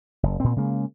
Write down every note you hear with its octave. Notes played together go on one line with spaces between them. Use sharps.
F#1
A#2 C4
C#3 G#3 A#3